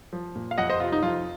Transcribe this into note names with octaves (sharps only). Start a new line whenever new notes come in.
F3
A#2
F5
F2 D#5 F#5
C5 D#5
C3 F4
D#4
F2 F4